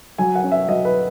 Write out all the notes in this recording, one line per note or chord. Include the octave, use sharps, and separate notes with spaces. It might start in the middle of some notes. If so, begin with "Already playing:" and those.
F#3 G#5
F#5
C#4
E5
F#3 D#5
B4